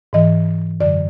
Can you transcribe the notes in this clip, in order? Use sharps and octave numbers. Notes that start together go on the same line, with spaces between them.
G#2 E3 D#5
F#2 D3 F#3 D5